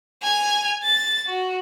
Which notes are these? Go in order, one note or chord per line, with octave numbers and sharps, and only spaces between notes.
G#5 F7
A6
F#4